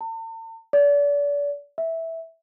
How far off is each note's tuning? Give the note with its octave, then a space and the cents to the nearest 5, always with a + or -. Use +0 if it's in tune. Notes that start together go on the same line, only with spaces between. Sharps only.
A5 +45
D5 -35
E5 -10